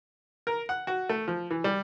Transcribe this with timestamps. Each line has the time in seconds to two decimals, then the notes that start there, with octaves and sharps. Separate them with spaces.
0.47 A#4
0.69 F#5
0.87 F#4
1.09 A3
1.28 F3
1.50 E3
1.64 G3